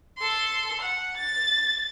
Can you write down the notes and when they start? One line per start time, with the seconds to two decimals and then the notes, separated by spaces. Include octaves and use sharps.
0.18 A4 C6
0.80 F#5
1.17 A6